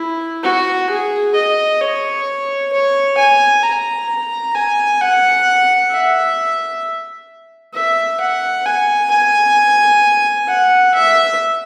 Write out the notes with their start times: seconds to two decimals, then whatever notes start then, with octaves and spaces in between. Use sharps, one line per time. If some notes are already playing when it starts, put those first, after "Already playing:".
Already playing: E4
0.43 F#4
0.90 G#4
1.35 D#5
1.81 C#5
2.73 C#5
3.18 G#5
3.63 A#5
4.55 G#5
5.01 F#5
5.91 E5
7.74 E5
8.20 F#5
8.66 G#5
9.11 G#5
10.48 F#5
10.95 E5